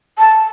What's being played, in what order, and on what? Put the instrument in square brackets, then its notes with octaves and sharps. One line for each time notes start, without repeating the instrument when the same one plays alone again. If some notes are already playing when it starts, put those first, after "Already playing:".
[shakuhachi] A5